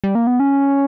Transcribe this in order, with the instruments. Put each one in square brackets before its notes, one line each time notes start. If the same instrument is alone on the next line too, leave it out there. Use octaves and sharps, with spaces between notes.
[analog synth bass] G3
A#3
B3
C#4